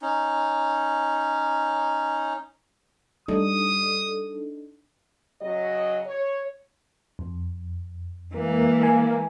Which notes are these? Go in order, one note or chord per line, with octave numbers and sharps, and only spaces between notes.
C#4 D#4
G3 D4 D#4 A4 D#6
C#3 F#3 D#5
C#5
F2
E3 G#3 A#3
G#5